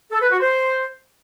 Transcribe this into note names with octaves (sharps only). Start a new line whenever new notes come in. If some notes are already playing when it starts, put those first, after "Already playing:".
A4
B4
F#4
C5